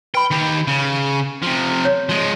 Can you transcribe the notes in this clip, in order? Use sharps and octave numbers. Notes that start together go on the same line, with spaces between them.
B4 G5 B5
D#3 G4
C#3
C3 F3
C#5
F3 G#3